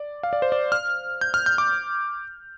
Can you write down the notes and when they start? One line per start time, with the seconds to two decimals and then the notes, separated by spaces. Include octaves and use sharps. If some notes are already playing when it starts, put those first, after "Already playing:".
Already playing: D5
0.23 F5
0.33 D5
0.42 C5
0.52 D5
0.72 F6
1.21 G6
1.34 F6
1.46 G6
1.58 D6